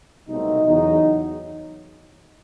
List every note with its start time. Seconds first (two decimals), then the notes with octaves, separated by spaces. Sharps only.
0.28 C2 B2 F#3 A3 C4 D#4
0.67 E2 C#3 F#3 D#4